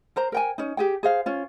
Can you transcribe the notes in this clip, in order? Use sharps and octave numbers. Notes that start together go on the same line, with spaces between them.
A#4 C5 A#5
A#4 G5 G#5
C#4 D#4
G4 G#4 G5
G#4 C5 F5
C#4 F4